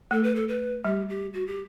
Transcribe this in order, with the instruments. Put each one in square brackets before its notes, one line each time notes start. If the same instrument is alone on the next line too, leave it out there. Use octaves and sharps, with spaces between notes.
[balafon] A3 [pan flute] A4
[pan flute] B4
A4
B4
[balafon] G3 [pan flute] G4
[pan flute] G4
F#4
G4